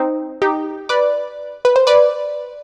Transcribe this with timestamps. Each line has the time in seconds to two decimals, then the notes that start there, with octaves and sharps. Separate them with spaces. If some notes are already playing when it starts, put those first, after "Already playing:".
Already playing: C4 D#4
0.42 D#4 G4
0.89 B4 D5
1.65 B4
1.76 C5
1.87 B4 D5